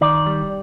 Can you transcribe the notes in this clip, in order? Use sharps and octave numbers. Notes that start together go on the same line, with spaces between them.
D#3 D5
G3